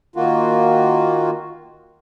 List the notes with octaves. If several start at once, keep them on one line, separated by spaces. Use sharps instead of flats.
D#3 A#3 F4 F#4